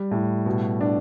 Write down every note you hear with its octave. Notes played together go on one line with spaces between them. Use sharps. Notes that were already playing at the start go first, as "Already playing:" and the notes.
Already playing: G3
A2
B2
D4